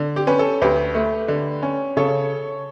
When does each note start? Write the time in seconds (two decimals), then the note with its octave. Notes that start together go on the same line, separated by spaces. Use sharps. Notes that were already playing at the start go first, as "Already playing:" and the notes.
Already playing: D3
0.16 G4
0.27 C#4 B4
0.39 A4
0.62 D2 G4 B4
0.95 A3
1.28 D3
1.63 C#4
1.97 C#3 A4 C#5